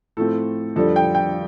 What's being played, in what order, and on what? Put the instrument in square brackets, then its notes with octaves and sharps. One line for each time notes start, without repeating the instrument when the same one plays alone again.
[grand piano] A2 F3 A3 C4 A4
F2 D3 G3 A4
G5
G5